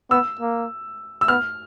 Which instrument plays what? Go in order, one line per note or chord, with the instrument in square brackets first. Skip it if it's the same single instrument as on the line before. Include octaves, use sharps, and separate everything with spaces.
[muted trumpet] B3 [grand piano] E6
[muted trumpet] A#3
[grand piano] E6
[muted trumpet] B3 [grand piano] F6